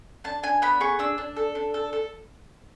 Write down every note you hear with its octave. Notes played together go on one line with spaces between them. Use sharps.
D4 A5
D4 G#5
B3 B5
G#4 C#6
D4 E6
D4
A4
D4
A4
A4